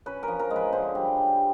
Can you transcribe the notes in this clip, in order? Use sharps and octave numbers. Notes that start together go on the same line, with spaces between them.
C#4 B4
A#4
F3
A#4
G#3
B4
D3 C5
G3
G3